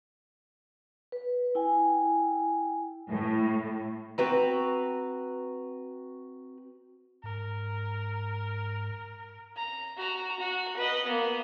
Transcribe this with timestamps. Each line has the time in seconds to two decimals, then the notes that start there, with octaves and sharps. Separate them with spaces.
1.12 B4
1.55 E4 G5 G#5
3.10 A2
4.18 C4 F#4 B4 A#5
7.24 G#2 A#4
9.56 A#5
9.97 F#4 A#5
10.40 F#4
10.77 B4 D#5
11.06 A#3 B3